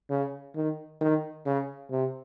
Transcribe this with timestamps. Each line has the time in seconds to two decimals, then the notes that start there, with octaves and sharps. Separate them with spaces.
0.10 C#3
0.56 D#3
1.01 D#3
1.46 C#3
1.91 C3